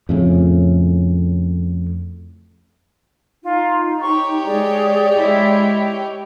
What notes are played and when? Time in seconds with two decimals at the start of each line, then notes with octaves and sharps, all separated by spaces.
0.09 F2 A2 C#3
3.43 D#4 F4
4.01 G4 C#5 C#6
4.46 G#3 G#4 D5
5.14 G#3 E4 D#5